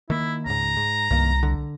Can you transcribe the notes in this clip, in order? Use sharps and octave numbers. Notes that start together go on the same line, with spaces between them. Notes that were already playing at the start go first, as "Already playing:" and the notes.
D#3 A#3 E4
C#2 G#2 A#5
G#2
C2 G2 D#3 A#3
D3